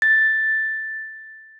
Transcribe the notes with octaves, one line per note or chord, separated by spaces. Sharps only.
A6